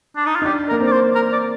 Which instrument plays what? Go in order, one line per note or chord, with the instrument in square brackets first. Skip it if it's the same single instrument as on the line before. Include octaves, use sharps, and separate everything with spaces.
[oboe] D4
D#4
F4
[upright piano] D#4
[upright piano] D4 [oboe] G4
[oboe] A#4
[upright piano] A#3
C4
[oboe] D5
C5
A#4
D5